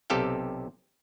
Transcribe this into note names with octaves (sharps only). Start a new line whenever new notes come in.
B1 C3 G4 A4 F5 G5